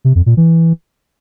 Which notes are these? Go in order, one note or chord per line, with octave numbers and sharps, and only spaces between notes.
C3
F2
A#2
E3